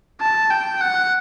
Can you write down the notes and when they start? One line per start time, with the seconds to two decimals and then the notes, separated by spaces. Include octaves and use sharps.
0.21 A5
0.50 G5
0.81 F#5